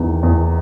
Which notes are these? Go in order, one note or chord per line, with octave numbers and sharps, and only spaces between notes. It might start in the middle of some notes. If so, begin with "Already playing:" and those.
Already playing: E2 D#3
E2